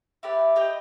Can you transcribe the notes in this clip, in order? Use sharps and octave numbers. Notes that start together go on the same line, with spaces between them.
E4 G4 B4 D5
G4 B4 D#5 G5